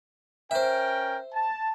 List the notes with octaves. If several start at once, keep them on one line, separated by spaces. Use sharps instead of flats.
C#4 A#4 C5 E5 G5
A5